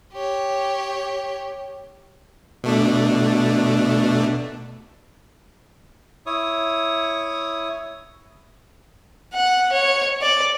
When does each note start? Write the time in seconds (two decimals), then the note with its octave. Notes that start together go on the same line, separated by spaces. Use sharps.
0.13 G4 C#5
2.64 B2 A3 D4
6.26 E4 C#5 D#6
9.34 F#5
9.72 C#5
10.22 D5